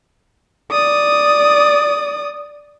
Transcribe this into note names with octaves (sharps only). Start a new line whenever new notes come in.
D5 D#6